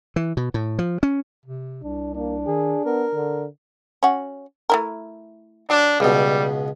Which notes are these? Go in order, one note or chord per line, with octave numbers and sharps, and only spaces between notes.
E3
B2
A2
F3
C#4
C3
C2 D4
A#3 D4
D#3 G#4
B3 A#4
D3
C#4 F#4
A3 E4 A#4
F#3 D4
C#2 B2 G3